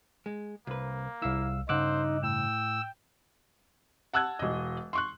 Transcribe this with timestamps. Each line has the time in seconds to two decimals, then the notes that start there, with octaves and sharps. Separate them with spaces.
0.26 G#3
0.67 C2 A#3 B4
1.22 C2 E4 F5 E6
1.69 G2 C#3 D#4 C5 F#5 D6 E6 F#6
2.23 A2 G5 E6
4.13 F#5 A5 E6 F#6 G#6
4.39 E1 D#5
4.93 C6 C#6 F#6